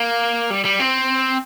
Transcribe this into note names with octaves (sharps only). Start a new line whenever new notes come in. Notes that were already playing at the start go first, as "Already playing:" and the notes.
Already playing: A#3
G3
G3
C4